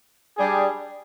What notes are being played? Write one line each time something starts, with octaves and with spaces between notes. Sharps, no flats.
G3 D4 G#4